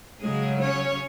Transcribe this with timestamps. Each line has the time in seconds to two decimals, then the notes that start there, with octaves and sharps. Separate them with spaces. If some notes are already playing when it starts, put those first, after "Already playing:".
0.22 C#3 F#3 G#3 G#4
0.59 C#4 C#5